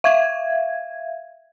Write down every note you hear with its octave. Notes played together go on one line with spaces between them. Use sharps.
E5 F5 G#6